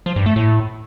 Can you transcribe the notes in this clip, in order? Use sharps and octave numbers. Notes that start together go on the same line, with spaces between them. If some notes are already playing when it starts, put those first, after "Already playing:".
F3
G2
A3
A2